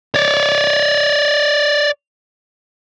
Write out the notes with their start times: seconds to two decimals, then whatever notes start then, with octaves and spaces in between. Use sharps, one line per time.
0.14 C#5 D5